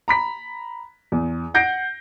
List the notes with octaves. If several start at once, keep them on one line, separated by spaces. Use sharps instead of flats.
A#5 B5 B6
E2
F#5 G6 A#6 C7 D7